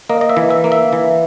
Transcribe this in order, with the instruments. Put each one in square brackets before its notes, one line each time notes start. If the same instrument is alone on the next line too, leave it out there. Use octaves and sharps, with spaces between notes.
[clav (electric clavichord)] A#3 D#5
D#5
E5
E3
E5
A#3
E5
E3